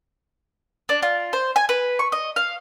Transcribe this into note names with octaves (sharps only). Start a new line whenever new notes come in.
D4
F4
C5
G#5
B4
C#6
D#5
F5